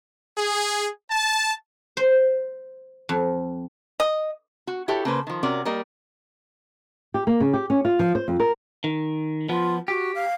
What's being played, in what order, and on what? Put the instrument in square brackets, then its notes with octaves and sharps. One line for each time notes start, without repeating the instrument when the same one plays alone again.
[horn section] G#4
A5
[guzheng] C5
F2
[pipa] D#5
[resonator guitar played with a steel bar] F#4
E4 F#4 G4 A4 C#5
C#3 A#3 B4 C5
D#3 F3
C3 C#4 F#4 A#4 D5
G3 A#3 A#4 D#5
[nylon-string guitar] G4
A#3
C#3
G4
C#4
F4
F3
C5
F2
A#4
[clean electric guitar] D#3
[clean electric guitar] F3 B3 [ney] F4
[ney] F#4 [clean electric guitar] G4
[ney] F5